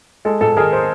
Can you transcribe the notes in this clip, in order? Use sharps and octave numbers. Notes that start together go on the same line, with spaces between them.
G#3 A4
G#2 A4
D#3 G#4 A#4
A#4 C5